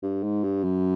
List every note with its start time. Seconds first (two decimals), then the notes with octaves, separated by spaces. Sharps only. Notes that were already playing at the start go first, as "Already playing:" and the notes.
0.03 G2
0.23 G#2
0.44 G2
0.64 F#2